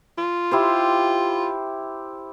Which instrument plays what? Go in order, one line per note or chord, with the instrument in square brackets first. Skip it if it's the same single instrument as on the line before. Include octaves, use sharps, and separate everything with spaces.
[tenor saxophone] F4
[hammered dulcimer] E4 G4 C5